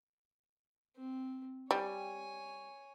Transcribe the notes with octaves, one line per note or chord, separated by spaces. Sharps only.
C4
G3 C#5 G#5